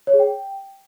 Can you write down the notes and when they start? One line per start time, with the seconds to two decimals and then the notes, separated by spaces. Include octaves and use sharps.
0.07 C#5
0.13 G#4
0.19 G5